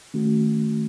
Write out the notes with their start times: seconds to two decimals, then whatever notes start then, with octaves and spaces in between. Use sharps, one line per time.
0.14 D#3 A3 C#4 F#4